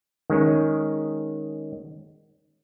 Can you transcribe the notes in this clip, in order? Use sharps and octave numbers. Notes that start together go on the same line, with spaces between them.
D#3 G#3 C#4